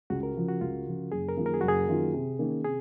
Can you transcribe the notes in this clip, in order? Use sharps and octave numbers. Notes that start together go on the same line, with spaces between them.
C#2 F#4
A#4
C#3 F3
F#4
C#2 F4
C#3 F3
F#1 G#4
A#4
F#2 D#3 A#3 F4
A#4
G#4
F#1 F#4
G#4
F#2 D#3 A#3 F4
C3
D#3 A#3 C#4
C3 G#4